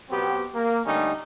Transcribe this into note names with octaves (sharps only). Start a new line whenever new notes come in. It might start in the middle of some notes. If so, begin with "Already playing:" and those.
B2 F#3 B3 C4 G4
A#3
D3 G3 A3 C#4 D#4